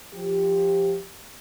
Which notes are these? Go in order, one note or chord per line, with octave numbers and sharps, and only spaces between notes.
F3 G4